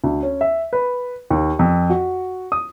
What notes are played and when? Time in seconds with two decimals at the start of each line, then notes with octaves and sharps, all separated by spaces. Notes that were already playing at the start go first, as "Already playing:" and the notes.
0.04 D2
0.23 C#4
0.41 E5
0.73 B4
1.30 D#2
1.59 F2
1.90 F#4
2.52 D#6